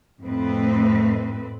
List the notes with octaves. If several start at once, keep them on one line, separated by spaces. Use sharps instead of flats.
F2 A2 A3 C4 B4